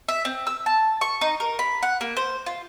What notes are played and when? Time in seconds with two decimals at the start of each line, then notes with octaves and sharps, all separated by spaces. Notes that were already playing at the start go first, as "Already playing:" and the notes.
0.08 E5
0.25 C4
0.47 E6
0.66 A5
1.01 C#6
1.21 D#4
1.40 A#4
1.59 B5
1.83 F#5
2.01 A#3
2.17 C5
2.46 F4